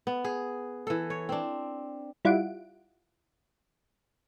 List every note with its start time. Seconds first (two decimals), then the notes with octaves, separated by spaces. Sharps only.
0.07 B3
0.24 G#4
0.87 E3 A4
1.10 C#5
1.29 C4 D4
2.25 G3 E4 F4 F#5 D7